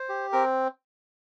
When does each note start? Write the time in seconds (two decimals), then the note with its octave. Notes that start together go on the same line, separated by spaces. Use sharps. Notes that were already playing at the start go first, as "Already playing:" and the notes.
Already playing: C5
0.09 G4
0.33 C4 A#4